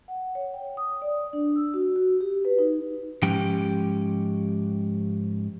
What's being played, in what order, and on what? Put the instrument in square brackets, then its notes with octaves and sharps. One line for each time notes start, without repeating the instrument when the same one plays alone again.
[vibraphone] F#5
C#5
G5
D#6
D5
D4
E6
F#4
F#4
G4
B4
D#4
[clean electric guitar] G#2 F3 C#4 G4 G5